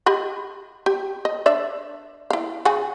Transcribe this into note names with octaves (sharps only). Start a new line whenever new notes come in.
G4 D#5 B5
G4
D#5
D4 D5 E5
E4 F5
C#3 F#4 G#5